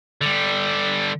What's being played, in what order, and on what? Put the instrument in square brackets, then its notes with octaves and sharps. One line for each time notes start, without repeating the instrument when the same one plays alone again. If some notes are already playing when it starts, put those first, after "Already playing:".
[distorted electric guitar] D3 G3